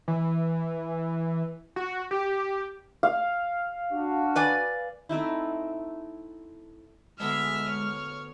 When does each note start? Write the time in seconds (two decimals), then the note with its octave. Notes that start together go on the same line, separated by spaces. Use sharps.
0.08 E3
1.76 F#4
2.11 G4
3.03 F5
3.91 D4 F#4
4.36 B4 D5 G#5
5.09 A3 C4 D#4 E4
7.20 D2 G#3 B3 D4 E5 F6
7.69 C#5